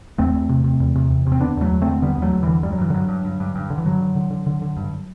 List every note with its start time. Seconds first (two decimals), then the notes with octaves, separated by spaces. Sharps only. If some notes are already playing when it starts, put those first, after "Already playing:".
0.18 E2 A3 C4
0.35 E2
0.49 C3
0.64 C3
0.80 E2
0.95 C3
1.11 E2
1.26 C3
1.32 C4
1.41 D3 B3 D4
1.57 E2 F#3 A3
1.72 E2
1.82 D3 A3 C4
2.02 D3 G3 B3
2.15 B3
2.18 E2 F#3 A3
2.33 E2
2.43 D3 E3 G3
2.63 G2 G3
2.72 F#3
2.78 G2 E3
2.90 G2 D3 F#3
3.08 G2
3.25 G2
3.40 G2
3.55 G2
3.70 D3
3.78 E3
3.85 G2 D3 F#3
4.01 D3
4.15 D3
4.30 D3
4.47 D3
4.62 D3
4.77 G2